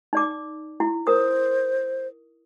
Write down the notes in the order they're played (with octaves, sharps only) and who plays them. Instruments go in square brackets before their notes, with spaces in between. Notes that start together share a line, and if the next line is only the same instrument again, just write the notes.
[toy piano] D#4 D5 D6
E4
[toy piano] A#4 D#6 [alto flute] C5